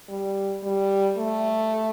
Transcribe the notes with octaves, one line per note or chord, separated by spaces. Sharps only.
G3
G3
A3